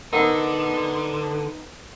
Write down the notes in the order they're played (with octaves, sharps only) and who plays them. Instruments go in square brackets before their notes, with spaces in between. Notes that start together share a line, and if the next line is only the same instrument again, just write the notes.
[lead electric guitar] D3 [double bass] B3 [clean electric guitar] D#4 [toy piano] A#4 F#5